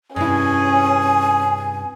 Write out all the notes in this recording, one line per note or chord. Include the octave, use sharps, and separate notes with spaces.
G2 C3 C#4 E4 G#4 G#5